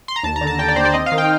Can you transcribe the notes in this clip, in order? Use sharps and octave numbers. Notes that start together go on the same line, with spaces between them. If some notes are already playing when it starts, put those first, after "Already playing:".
C6
A#5
D#2 A5
A#5
D3
A5
D3 G5
D5
D#2 C5
D5
C4 D#5
F5
D#3
G5